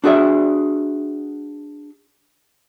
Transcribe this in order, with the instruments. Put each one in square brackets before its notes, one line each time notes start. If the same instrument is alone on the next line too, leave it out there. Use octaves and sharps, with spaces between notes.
[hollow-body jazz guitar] D4 F#4 G#4 D5 E5